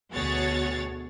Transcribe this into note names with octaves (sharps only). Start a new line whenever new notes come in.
D2 B2 F#4 G#4 C#5 A6